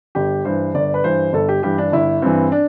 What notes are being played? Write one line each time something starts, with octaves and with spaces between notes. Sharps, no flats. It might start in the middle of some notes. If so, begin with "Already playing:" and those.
G1 G4
G2 E3 C5
G1 D5
B4
G2 E3 C5
G1 A4
G4
G2 E3 G4
D4
G1 E4
G2 E3 C4
D4